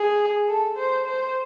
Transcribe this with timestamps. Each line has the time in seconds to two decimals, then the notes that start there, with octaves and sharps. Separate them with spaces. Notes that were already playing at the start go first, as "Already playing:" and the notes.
Already playing: G#4
0.48 A4
0.77 C5
1.07 C5